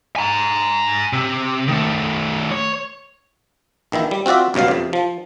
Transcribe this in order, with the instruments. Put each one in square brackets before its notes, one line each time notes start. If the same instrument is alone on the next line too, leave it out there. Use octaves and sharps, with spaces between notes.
[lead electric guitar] G#5 A#5
C3
D#3 A3
C#5
[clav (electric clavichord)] A#1 D#3 E3 E4
G3
C4 F4 F#4 D5 E5
C#2 G2 B2 F#3 F5
F2 C3
F3